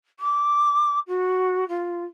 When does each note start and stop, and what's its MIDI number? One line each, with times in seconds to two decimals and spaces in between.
0.19 0.99 86
1.07 1.67 66
1.68 2.05 65